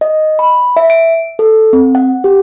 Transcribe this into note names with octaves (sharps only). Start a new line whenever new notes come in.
D#5
B5
E5
D7
A4
C4
F#5
G4